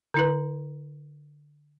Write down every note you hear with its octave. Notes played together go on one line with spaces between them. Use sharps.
D3 E4 B4